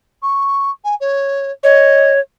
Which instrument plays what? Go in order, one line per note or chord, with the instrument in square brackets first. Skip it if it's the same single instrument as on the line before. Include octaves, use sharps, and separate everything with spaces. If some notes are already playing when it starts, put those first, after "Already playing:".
[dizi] C#6
G#5
C#5
[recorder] C#5 [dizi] D#5